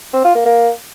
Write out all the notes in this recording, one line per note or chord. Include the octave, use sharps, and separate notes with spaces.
C4
F4
A#3
A#3